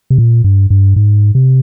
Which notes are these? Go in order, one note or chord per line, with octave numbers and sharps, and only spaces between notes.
C3
A#2
G2
G2
G#2
C3